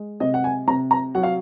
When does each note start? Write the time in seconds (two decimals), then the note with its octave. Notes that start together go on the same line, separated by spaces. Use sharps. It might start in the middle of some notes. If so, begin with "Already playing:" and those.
Already playing: G#3
0.20 C3 D#5
0.34 F#5
0.44 G#5
0.67 C3 A#5
0.91 A#5
1.15 F#3 F#5
1.23 F5